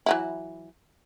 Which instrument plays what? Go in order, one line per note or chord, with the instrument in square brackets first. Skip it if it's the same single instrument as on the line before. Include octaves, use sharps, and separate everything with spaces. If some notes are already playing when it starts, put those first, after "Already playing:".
[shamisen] E3 F#3 E4